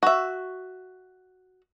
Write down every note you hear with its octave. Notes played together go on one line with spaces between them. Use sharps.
F#4 E5